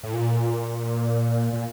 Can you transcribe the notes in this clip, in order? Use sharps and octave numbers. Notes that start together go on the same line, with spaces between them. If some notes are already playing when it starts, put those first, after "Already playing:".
A2
A#2
A#2